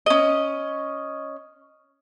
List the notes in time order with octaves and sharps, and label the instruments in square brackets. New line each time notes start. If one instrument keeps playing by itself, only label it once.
[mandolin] C#4 D#5